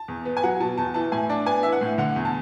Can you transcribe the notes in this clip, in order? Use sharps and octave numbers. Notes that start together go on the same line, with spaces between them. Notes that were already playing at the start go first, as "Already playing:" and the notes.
Already playing: A5
E2
B3
G#5
F#3 F#5
B2 A5
E2 A5
E3 A5
A2 G#5
D4 A5
B3 G#5
E3 E5
F#5
A2
D3 F#5
E2
A5